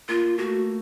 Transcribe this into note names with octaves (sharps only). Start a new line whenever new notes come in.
A#3 F4
A3 F#4